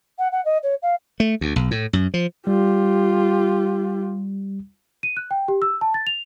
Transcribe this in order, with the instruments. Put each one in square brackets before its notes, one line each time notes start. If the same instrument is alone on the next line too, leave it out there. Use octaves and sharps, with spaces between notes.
[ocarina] F#5
F#5
D#5
C#5
F5
[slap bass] A3
D2
B1
A2
F#2
F3
[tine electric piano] G3 [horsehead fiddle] F4 G4
[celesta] D#7
F#6
G5
G4
E6
A5
A6
F7